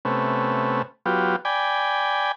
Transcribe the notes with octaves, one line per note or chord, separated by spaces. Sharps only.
C3 A3 B3 C#4
F#3 B3 F4 G4
D5 G5 G#5 B5